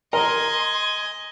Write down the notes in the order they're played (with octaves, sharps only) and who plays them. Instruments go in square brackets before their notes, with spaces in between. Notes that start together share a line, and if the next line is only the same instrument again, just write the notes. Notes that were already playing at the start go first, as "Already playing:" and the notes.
[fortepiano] A#4 [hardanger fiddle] D#5 G#5 [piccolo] C6